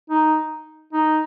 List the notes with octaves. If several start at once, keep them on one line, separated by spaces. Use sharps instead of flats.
D#4
D#4